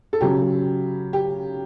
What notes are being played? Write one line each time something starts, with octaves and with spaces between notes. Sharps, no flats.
A4
C#3 F#3 G4
G4